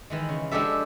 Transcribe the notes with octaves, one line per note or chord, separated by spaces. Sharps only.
D#3 E3 G#3
C#3
F3 G#3 D4 G4 A4 E5